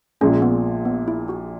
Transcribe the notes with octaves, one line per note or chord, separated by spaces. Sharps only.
A#1 A#2 G#3 C#4
B3
B3
E4
F#4